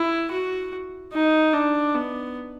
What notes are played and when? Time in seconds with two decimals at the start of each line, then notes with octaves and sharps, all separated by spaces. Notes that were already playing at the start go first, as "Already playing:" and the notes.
Already playing: E4
0.31 F#4
1.13 D#4
1.53 D4
1.94 B3